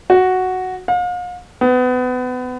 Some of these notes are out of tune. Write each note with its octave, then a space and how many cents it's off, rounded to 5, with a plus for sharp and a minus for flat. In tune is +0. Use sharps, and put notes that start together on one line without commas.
F#4 +0
F5 +40
B3 +30